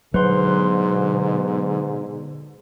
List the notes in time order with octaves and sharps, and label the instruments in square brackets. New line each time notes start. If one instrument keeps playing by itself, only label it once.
[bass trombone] G#2 [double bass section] B2 D3 [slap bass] F#3 [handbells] B4 C5 C6